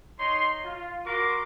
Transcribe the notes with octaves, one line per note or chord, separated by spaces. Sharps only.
D#4 C#5 C6
F4
F#4 A#4 C6 D6